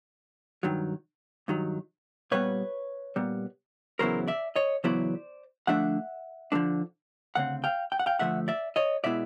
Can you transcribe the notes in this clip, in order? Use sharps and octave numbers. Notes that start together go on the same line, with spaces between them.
G2 D#3 F#3
G2 D#3 F#3
A#2 G3 B3 B4 C#5
A#2 G3 B3
E2 C#3 F#3 B3 E4 A#4 C5
D5 E5
C#5 D#5
E2 C#3 F#3 B3 E4 C5 D5
D3 F3 A3 D4 E5 F#5
D3 F3 A3 D4
D2 C#3 C4 F#5
F5 G5
G5
F#5
F5 G5
D2 C#3 F3 A3 E5 F#5
D5 E5
C#5 D#5
B2 G#3 B3 E4 D5 E5